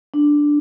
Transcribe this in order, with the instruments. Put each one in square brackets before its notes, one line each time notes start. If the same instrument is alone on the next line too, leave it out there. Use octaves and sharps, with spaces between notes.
[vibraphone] D4